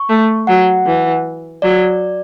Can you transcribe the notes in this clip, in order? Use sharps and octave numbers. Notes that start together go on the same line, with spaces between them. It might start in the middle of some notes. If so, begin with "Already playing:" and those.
Already playing: C#6
A3
F#3 F#5
E3
F#3 D5